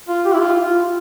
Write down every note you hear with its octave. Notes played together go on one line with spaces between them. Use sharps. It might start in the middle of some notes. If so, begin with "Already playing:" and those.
F4
G4
E4
F4
F4